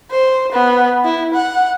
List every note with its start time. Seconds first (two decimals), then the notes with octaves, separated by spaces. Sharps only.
0.11 C5
0.52 B3
1.04 E4
1.34 F#5